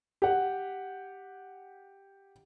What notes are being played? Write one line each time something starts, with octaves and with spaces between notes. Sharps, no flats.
G4 F#5